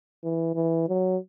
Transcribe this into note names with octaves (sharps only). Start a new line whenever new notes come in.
E3
E3
F#3